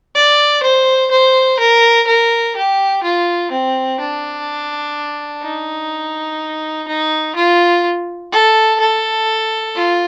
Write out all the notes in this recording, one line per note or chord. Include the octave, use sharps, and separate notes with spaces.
D5
C5
C5
A#4
A#4
G4
F4
C4
D4
D#4
D#4
F4
A4
A4
F4